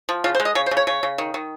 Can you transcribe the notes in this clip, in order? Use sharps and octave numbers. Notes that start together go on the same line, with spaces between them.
F3
C#3 F4
C5
G#3
D#5
C#3 C#5
C5
C#3
C#5
C#3 C#5
C#3
D#3
D#3